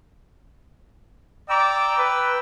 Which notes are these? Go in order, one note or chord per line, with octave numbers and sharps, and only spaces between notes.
D5 G5 A#5 D6 E6
B4